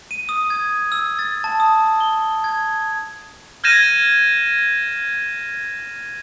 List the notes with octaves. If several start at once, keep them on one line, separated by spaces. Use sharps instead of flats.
D#7
D#6
G#6
E6
A6
A5
D#6
G7
G#6
F6 G6 G#6 A#6 D#7 E7